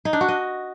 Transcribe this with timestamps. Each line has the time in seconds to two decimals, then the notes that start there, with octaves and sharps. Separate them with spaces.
0.05 D#4
0.13 D4
0.21 F#4
0.28 D#5